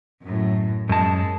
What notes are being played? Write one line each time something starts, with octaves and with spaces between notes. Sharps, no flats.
F#2 A2
F#2 G#3 A5